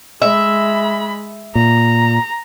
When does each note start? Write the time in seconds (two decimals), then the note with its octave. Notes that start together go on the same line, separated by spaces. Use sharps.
0.22 G#3 E5 B5
1.55 A#2 A#5